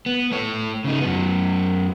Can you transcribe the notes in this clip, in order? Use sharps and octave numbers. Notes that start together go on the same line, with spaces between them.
B3
A3 C#5
C#3 D#4
F#2 B3